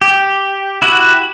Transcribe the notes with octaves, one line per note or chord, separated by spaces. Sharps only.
G4
E4 F#4 G4 F#5